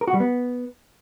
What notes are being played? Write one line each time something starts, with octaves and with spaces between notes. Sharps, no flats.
A#4
F#4
G3
B3